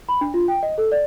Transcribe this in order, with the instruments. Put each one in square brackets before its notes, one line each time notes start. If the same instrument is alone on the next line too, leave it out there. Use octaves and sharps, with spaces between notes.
[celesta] B5
D4
F4
G5
D#5
A4
D5